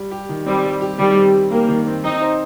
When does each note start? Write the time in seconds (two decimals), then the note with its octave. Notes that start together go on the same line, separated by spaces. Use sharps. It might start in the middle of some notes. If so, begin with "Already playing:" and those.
Already playing: G3
0.11 G4
0.29 D#3
0.46 G3 C4
0.64 G3
0.81 G4
0.99 D#3 G3
1.16 C4
1.34 G3
1.51 A#3 G4
1.68 D#3
1.87 C4
2.03 C4 D#4
2.22 C5